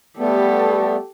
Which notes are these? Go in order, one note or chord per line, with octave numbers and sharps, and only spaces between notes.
G3 A3 B3 G4 A4